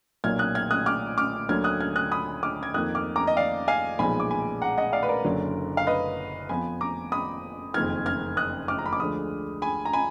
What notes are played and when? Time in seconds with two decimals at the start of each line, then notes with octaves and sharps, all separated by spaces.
0.24 B1 A#2 F#3 A#3 F6 G#6
0.39 D#6 F#6
0.55 F6 G#6
0.71 D#6 F#6
0.86 D6 F6
1.18 D6 F6
1.49 D2 D3 F#3 A#3 F6 G#6
1.64 D#6 F#6
1.81 F6 G#6
1.96 D#6 F#6
2.12 B5 D#6
2.43 D6 F6
2.63 G#6
2.74 F2 D#3 A#3 D#6 F#6
2.95 D6 F6
3.16 A#5 D6
3.27 D#5
3.37 D5 F5
3.68 F5 G#5
3.99 B1 A#2 F3 G#3 B3 G#5 B5
4.20 D6
4.31 G#5 B5
4.62 F#5 A#5
4.78 D#5 F#5
4.93 D5 F5
5.03 B4
5.09 A#4 D5
5.24 F#1 F#2 D3 F#3
5.77 F5
5.87 B4 D#5
6.49 F2 F3 B3 G#5 B5
6.81 A#5 D6
7.12 B5 D#6
7.74 F#1 F2 D#3 F6 G#6
8.06 F6 G#6
8.37 D#6 F#6
8.68 D6 F6
8.79 A#5
8.86 B5
8.93 D6
9.00 D2 D3 F3 G#3 B5 D#6
9.62 G#5 B5
9.85 A#5
9.93 G#5 B5